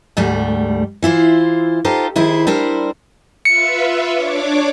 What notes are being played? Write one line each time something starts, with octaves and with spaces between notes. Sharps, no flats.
D2 G#2 G3 A3
E3 E4 F4 C5
D#4 F4 G4 A4 C5
D#3 E4 G#4 C5
G3 D4 E4 A#4 C5
F4 B4 E5 C#7
D4 C#5 D6